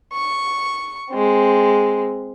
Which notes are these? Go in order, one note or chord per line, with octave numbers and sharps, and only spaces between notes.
C#6
G#3 C4